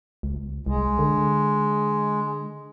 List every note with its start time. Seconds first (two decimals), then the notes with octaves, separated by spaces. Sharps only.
0.23 C#2
0.66 C2 G#3
0.99 D3